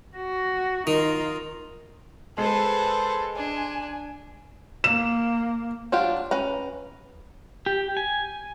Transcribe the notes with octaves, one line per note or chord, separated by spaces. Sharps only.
F#4
D#3 D#4 F4
G#3 A4 B4 C5
D4 G#5
A#3 E7
F#3 D4 F4 G4
C#4 B4 A#5
G4
G#5